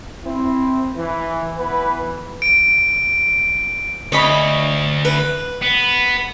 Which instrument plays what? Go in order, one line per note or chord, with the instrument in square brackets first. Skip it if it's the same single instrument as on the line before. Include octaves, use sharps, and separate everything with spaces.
[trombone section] C4 E4
E3
E3 B3 B4
[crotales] D7
[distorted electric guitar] D2 [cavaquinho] C#5 D#5 B5
[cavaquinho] B4
[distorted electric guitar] B3